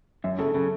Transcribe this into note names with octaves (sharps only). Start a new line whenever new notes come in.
F#2 E5
C#3 A4
C#3 A4